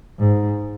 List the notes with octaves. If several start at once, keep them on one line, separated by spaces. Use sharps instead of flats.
G#2